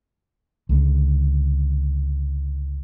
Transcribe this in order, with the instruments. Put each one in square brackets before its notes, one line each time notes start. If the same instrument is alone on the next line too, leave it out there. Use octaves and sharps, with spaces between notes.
[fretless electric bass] C#2 D3 G#3